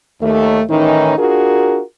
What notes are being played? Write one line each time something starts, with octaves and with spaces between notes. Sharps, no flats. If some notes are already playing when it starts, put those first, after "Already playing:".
D#2 A3
A2 D#3 E3 C#4 D#4
D4 F4 F#4 G#4 A#4